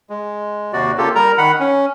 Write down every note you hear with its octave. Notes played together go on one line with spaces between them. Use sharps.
G#3
D#2 C3 F#4 D5
C#3 A#3 F4 G4 A4
G3 A#4 A#5
D#3 F#5 B5
C#4